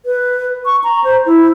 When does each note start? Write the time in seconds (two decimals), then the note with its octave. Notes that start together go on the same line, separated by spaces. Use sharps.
0.05 B4
0.65 C#6
0.84 A#5
1.04 C5
1.26 E4